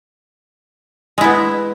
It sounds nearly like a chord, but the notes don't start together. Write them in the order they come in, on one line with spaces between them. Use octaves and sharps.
G#3 E4 B3